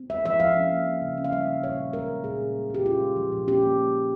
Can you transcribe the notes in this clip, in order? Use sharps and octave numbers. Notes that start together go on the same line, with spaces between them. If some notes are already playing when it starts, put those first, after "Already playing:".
Already playing: C4
G#3 E5
F3 E5
F3 F5
C#4
A#3
F3
C#3
C#4
F5
G3 E5
C#3
A#2 C#5
C#4
G#3 A#4
A#2
A#2 G#4
C#4
G3
A#2 G4
C#4 F4
G#3
F3
A#2
C#4 G4
A#3